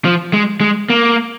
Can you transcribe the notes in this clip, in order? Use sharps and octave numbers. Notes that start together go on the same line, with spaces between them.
F3
G#3
G#3
A#3